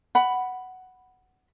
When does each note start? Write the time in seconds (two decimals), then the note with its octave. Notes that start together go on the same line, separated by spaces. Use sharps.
0.15 F#5 B5